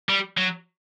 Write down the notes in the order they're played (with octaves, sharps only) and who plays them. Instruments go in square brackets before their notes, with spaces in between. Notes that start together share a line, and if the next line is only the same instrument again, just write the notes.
[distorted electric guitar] G3
F#3